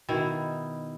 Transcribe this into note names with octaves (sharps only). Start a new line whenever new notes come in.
B2 D#3 E4